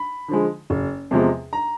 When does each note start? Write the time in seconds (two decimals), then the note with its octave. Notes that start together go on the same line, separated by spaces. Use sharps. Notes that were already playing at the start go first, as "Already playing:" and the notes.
Already playing: B5
0.28 D3 F3 G#3
0.70 F#1
1.11 E2 C3 F3 G#3
1.53 A#5